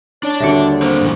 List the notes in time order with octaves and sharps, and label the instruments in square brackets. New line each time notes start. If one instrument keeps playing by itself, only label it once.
[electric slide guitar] D4 D5 A5 [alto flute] C#5
[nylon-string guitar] D#2 D3 G3 [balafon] F#4 E5
[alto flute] A#3 [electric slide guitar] C4 A#4 [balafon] C5
[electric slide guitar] G2 A#2 E3